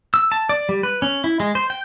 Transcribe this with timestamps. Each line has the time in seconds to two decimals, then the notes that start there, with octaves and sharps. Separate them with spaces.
0.14 E6
0.32 A5
0.49 D5
0.69 G3
0.83 B4
1.02 C#4
1.24 E4
1.40 G#3
1.55 C5
1.70 G5